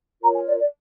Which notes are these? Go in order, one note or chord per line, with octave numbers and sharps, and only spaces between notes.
F4 A#4 C#5 A#5
G#5
D5
D5